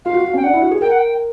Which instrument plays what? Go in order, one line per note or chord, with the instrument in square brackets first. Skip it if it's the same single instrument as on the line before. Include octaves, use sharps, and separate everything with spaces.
[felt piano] F4 [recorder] F5
[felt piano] F#4
F#4
[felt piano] C#4 [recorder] G5
[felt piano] D4 [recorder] F#5
[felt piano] E4
F#4
G#4
[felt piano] A#4 [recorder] G5
[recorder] F#5
G5